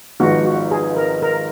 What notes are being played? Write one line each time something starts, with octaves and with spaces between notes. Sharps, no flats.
G#1 G#2 F3 B3 F#4
F#4
G#4
A#4
A#4